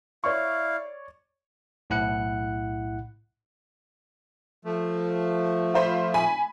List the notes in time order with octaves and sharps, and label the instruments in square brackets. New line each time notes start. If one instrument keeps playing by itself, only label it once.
[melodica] E4 F5 [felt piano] C#5 D5 C#6
[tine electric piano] B1 A2 E4 F#5 F#6 C#7
[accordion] F3 A3
[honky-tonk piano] F4 C5 B5
G#5 B5